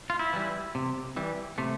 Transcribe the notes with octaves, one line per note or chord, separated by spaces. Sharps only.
F4
E4
E3 G3
C3
E3 G3
C3 A3